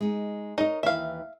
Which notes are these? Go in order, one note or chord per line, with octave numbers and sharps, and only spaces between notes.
G#3 D#4
D#4 A#4 C#5 D#5
D#2 E3 E5 F5